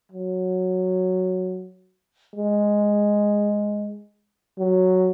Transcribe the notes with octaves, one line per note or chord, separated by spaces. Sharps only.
F#3
G#3
F#3